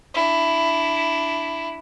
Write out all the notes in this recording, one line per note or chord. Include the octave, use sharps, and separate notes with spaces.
D4 E4